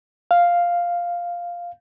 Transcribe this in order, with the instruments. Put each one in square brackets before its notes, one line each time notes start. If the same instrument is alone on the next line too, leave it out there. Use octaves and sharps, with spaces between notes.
[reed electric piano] F5